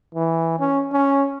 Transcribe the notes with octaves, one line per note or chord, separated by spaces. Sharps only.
E3
C#4
C#4